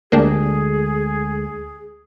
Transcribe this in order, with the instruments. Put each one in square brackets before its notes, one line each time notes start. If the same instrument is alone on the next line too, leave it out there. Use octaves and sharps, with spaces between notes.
[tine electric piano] D2 D3 G#3 [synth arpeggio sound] A#3 D4 G4 [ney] G#4